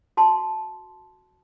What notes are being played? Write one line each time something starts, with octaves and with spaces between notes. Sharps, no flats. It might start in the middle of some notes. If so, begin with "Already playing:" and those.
F#4 A5 C6